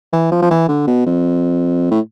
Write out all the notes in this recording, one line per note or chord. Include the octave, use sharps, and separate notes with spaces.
E3
F3
F3
E3
D3
B2
F2
A2